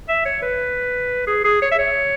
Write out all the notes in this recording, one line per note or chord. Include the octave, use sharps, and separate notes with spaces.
E5
C#5
B4
G#4
G#4
C#5
E5
C#5